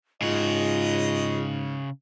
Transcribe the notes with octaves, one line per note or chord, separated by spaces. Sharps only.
G#2 C#3 F4 F#4 D#5